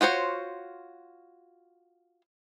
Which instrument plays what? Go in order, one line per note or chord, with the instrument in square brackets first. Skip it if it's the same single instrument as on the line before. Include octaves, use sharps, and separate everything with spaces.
[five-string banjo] F4 F#4 C5 C#5